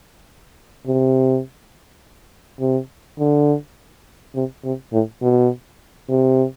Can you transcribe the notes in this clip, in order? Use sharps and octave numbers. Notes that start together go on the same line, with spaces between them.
C3
C3
D3
C3
C3
A2
B2
C3